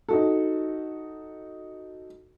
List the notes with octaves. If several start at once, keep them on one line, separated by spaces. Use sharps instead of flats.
D#4 F#4 A4